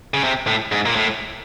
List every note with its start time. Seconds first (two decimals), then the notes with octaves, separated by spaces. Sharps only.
0.14 C#3
0.24 C3
0.47 A2
0.72 G#2
0.86 A#2
0.96 A2